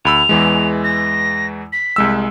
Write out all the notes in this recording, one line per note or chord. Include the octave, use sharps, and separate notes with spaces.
D2 B5 E6 F7
E2 E3 G#3
A#6
B6
C2 G#3 E6